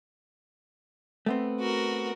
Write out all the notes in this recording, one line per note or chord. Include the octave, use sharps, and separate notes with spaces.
A3 B3 C4
F#4 A#4